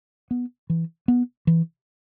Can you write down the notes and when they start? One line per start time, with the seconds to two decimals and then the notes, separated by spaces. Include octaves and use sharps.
0.31 B3
0.70 E3
1.08 B3
1.47 E3